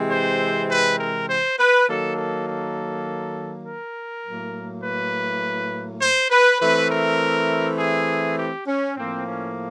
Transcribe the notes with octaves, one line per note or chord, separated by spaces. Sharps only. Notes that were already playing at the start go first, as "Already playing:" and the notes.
Already playing: C3 E3 G#3 C4
C5
B4
A#4
C5
B4
D#3 F#3 A#3 A4
A4
A4
A#4
A2 F#3 A#3
B4
C5
B4
E3 A3 C4 B4
A#4
G#4
G4
C#4
A2 F3 A#3 C4
C#4